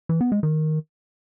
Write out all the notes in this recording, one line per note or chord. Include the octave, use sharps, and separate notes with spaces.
E3
B3
G#3
D#3